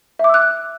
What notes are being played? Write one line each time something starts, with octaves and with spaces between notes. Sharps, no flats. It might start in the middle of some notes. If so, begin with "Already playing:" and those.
E5 D6 E6 F#6